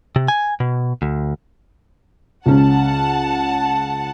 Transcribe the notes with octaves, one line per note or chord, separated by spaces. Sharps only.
C3
G#5
B2
D2
C#2 C#4 F#5 A5